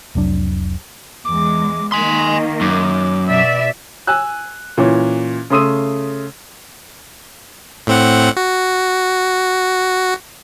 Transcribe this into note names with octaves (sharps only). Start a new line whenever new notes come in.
F1 C2 F#3 D4
E2 G#3 D6
D#3 A#3 G#5 C6 B6
D#5
F#2 D6
B2 D5 E5 E6
G#5 E6 F#6
A#2 E3 C#4
C#3 A3 C6 D#6 E6 D#7
A2 C4 F#5
F#4